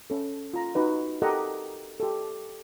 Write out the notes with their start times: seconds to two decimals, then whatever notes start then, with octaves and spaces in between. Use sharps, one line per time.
0.10 C#4 A4
0.54 F4 A#5
0.75 D#4 F#4 B4 D#5
1.22 G4 A4 A#4 D#5 F#5 A#5
2.00 G4 A4